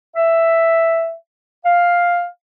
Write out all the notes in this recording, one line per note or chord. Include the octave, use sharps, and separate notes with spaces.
E5
F5